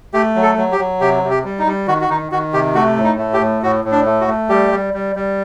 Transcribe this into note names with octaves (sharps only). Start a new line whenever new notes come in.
A3 G4
F#3
A4
F#3
G4
F#3
C3 G4
C3
G4
G3
D#4
G3
D#3 F#4
F#4
D#3 D#4
D#3 F#4
C3 G4
A3 F#4
A2
D#4
A3
G4
A2
A2 F#4
A2
D4
A3
F#4
A3
G3 G4
G3
G3
G3